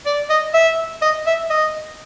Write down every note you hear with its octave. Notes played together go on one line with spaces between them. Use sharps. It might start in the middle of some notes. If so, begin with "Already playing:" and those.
D5
D#5
E5
D#5
E5
D#5